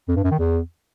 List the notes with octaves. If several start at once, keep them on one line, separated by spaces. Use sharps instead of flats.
F2
G2
F#2
D#3
E2